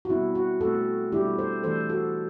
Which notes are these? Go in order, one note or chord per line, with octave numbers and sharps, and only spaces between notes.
F#4
B2 G3 C4 E4
F#4
B2 A3 C4 F#4 A4
B2 G3 D4 E4 G4
A4 C5
E3 A3 D4 A4 C5
F#4 A4